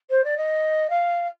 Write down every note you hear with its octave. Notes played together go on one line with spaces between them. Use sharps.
C5
D5
D#5
F5